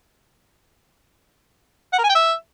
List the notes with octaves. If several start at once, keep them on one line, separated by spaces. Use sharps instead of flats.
F#5
A#4
G#5
G5
E5